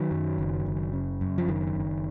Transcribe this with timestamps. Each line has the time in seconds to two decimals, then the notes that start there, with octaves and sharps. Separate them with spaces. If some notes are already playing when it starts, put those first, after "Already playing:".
Already playing: D#3 F#3
0.11 F#2
0.39 F#1
0.66 F#1
0.93 C#3
1.21 F#2
1.38 F3
1.48 F#1 D#3
1.76 F#1